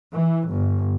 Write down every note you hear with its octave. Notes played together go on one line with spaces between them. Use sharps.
E3
G1